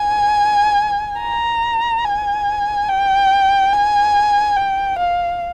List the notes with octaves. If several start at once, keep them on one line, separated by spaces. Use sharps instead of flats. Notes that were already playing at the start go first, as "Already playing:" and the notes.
Already playing: G#5
A#5
G#5
G5
G#5
G5
F5